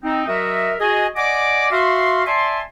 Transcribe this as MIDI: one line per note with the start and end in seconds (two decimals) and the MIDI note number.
0.03 0.24 60
0.03 0.24 63
0.27 0.74 54
0.27 0.74 66
0.27 0.74 70
0.27 0.74 75
0.27 0.74 76
0.79 1.06 66
0.79 1.06 68
0.79 1.06 75
0.79 1.06 80
1.16 1.69 74
1.16 1.69 75
1.16 1.69 78
1.16 1.69 80
1.16 1.69 86
1.71 2.22 66
1.71 2.22 76
1.71 2.22 77
1.71 2.22 84
2.26 2.61 74
2.26 2.61 76
2.26 2.61 80
2.26 2.61 81
2.26 2.61 84